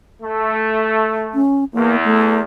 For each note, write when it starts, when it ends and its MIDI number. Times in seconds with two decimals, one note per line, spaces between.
0.22 1.42 57
1.34 1.64 61
1.74 2.43 40
1.74 1.96 58
2.05 2.41 57